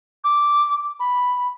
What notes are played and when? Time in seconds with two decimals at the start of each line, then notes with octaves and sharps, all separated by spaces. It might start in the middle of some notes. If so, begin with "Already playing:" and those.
0.24 D6
1.00 B5